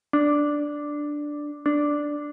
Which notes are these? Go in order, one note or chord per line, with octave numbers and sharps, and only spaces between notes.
D4
D4